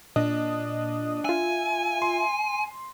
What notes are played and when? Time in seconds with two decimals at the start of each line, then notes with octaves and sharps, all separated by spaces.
0.16 A#2 D4 D#5 D#6
1.25 F4 E5 G#5
2.02 C6